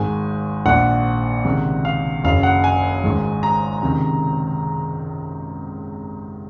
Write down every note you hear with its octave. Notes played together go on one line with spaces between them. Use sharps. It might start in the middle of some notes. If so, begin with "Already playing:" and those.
Already playing: G#1 G#2 D#3 G#5
A#1 A#2 F#5
C#2 C3 D#3
F5
F#1 F#2 C#3 F5
F#5
G#5
G#1 G#2 D#3
A#5
C#2 C3 D#3